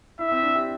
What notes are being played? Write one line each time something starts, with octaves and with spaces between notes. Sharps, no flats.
E4 E5
C4
D4
G4